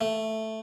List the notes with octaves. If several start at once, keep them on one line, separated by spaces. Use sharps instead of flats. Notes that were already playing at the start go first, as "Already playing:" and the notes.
A3